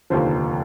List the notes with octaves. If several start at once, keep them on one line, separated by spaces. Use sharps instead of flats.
F1 D#2 D3 F3 C5